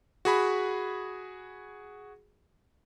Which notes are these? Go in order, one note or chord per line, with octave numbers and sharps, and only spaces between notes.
F#4 G#4 B5